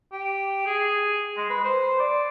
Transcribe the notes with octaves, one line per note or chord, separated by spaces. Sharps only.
G4
G#4
G#3
B4
C5
D5